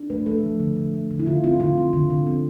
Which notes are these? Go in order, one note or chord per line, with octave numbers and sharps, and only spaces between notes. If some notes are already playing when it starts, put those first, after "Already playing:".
Already playing: D4
A3 B4
A3 A4
F3
D3
D3
A3
D3
E4
D3 F4
C4 F4
D3 F4
C4
D3
D3
C4